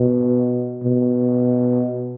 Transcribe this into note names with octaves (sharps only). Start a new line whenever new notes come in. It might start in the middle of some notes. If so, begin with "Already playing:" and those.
Already playing: B2
B2